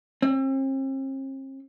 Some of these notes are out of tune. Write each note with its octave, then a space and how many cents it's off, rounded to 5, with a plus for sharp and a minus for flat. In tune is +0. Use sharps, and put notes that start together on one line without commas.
C4 +45